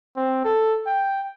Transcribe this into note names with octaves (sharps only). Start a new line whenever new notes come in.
C4
A4
G5